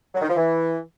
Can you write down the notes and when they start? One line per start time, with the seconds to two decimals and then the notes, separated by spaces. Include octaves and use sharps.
0.14 F#3
0.21 D#3
0.29 F3
0.36 E3